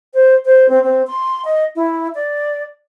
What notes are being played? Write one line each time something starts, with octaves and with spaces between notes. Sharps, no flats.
C5
C5
C4
C4
C6
D#5
E4
D5